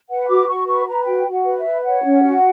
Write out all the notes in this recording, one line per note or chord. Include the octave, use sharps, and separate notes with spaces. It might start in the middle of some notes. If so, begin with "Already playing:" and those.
B4 F#5
F#4 D6
F#4 C#6
B4 C#6
B4 A#5
F#4 G5
F#4
F#5
B4
E5
B4
C#5 F#5
C#4
F#4